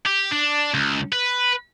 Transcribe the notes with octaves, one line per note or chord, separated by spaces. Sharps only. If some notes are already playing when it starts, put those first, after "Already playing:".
G4
D4
C#2
B4